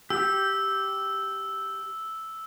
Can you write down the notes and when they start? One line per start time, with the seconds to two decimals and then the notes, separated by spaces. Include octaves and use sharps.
0.10 G4 G5 E6